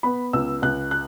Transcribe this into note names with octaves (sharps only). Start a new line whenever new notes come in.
B3 B5
C#2 E6
C#2 F#6
F#6